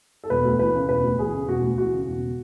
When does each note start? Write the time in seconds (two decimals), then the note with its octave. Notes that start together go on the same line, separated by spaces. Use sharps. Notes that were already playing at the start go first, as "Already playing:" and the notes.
0.24 A4
0.30 E1 B4
0.45 D2
0.59 E3 B4
0.75 C#3
0.89 E1 B4
1.04 D2
1.19 E3 G#4
1.33 C#3
1.48 E1 F#4
1.62 D2
1.77 E3 F#4
1.93 C#3
2.07 E1